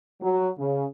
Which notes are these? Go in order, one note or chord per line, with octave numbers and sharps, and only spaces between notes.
F#3
C#3